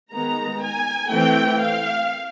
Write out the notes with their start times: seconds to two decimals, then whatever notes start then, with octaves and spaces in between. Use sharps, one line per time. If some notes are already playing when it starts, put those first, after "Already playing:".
0.12 D#3 G#3 B3 A#5
0.63 G#5
1.11 E3 A3 C4 G5
1.61 F5